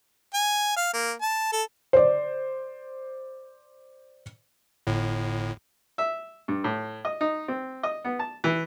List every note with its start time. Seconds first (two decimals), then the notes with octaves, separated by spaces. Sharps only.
0.34 G#5
0.77 F5
0.94 A#3
1.21 A5
1.53 A4
1.93 C5 D5
4.87 G1 A2
5.98 E5
6.48 G2
6.64 A2
7.05 D#5
7.21 D#4
7.48 C4
7.83 D#5
8.05 B3
8.19 A5
8.44 E3